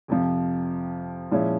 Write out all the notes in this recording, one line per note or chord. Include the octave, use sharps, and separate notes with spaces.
F2 C3 F3
A#2 F3 G#3 C#4 E4